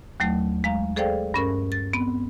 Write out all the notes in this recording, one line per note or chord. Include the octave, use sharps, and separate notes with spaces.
D#2 F#3 A3
G#3 F5 A#5
G#4 A4 C5 D5 F5 G5
G2 C#4 A#4
A6
B3 C4